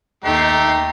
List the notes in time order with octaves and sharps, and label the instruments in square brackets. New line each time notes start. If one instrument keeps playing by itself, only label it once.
[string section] D#2 D#4 C7 [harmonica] A3 G4 [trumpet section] A#5